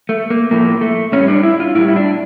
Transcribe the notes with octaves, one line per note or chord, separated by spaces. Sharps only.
A3
A#3
A2 F3 A3 A#3
A3
A2 G3 C#4
D4
E4
F4
A2 G3 E4
E4
D4